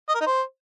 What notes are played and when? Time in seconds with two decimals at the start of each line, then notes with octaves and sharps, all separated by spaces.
0.09 D#5
0.15 A#4
0.20 D#4
0.26 C5